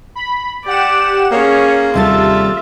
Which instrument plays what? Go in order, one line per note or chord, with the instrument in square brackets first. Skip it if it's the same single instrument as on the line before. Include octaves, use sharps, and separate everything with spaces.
[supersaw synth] B5
[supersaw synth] G4 F#5 E7 [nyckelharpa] D5
[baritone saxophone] A#3 [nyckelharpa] C#4 G#4 [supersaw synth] C#5
[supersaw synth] D#2 A6 [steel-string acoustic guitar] C3 G3 A4 [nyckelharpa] F4 E5